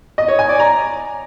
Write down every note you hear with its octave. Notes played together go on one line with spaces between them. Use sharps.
D#5
C#5
G#5
D5
A#5